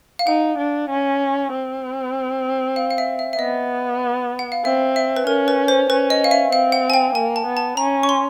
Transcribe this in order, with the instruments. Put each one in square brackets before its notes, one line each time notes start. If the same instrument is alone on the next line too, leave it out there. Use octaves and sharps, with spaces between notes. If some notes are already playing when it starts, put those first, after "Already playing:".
[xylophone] F5
[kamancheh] D#4 [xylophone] F#5
[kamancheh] D4
C#4
C4
[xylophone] F5
F5
E5
E5
E5
[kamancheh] B3 [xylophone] D#5
[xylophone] F#5
F5
[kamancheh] C4 [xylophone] E5
[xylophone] E5
B4
[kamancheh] C#4 [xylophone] A#4
[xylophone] B4
C5
[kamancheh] C#4 [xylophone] B4
[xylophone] D#5
F5
E5
[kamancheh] C4 [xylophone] F5
[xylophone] F#5
G#5
G5
[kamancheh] A#3 [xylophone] G#5
[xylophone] A5
[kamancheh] B3
[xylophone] A5
[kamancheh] C#4 [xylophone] A#5
[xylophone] C#6
C6